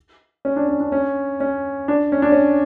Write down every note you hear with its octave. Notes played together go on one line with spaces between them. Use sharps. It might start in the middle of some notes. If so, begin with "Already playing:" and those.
C#4
D4
C#4
D4
C#4
C#4
D4
C#4
D4
C#4